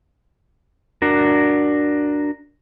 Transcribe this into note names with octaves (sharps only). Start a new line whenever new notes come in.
D4 F#4 A#4